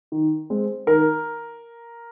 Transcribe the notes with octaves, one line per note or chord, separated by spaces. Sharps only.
D#3
G#3 C4
D#3 A#4